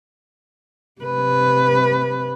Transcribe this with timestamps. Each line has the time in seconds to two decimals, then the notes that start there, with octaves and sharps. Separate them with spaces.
1.02 C3 B4